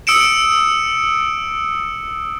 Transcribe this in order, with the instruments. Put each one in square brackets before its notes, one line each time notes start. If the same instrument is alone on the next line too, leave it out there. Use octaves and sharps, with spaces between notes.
[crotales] D#6 E6 C#7 D7 E7